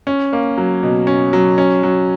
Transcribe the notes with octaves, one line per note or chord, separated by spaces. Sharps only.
C#4
A#3
F#3
B2
C#4
F#3
C#4
F#3